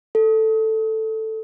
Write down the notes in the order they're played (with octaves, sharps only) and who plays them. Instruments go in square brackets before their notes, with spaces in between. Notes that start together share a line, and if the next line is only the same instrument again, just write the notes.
[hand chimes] A4